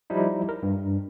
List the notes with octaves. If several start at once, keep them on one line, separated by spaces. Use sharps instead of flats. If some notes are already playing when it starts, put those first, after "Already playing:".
F3 G3 D#4 E4
A#4
G2